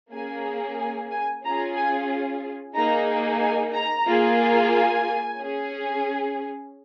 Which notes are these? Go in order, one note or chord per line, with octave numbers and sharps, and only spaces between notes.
A#3 C#4 G#4 G#5
G#5
G#5
C#4 F4 G#4 A#5
G#5
A#3 D#4 G#4 A#5
G#5
A#5
A#3 F4 G#4
G#5
C#4 G#4